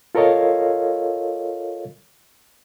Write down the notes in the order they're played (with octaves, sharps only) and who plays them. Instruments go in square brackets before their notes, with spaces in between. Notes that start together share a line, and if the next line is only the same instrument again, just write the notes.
[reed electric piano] F4 A4 A#4 C#5 D#5 F5